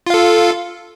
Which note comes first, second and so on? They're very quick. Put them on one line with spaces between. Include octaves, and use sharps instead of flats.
F4 F5 A4